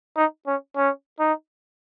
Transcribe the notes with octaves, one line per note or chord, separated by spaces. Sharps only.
D#4
C#4
C#4
D#4